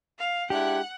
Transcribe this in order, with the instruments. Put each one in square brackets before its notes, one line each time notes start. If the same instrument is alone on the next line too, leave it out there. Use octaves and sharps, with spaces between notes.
[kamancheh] F5
[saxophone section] G#3 D4 E4 [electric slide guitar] G4 [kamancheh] F#5